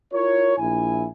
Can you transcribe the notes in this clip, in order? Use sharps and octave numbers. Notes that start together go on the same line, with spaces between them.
E4 F4 A#4 C#5
A#1 E4 G#5